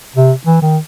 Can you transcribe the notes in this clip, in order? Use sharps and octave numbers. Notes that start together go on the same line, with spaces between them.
C3
E3
D#3